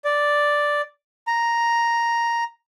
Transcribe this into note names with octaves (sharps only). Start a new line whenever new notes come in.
D5
A#5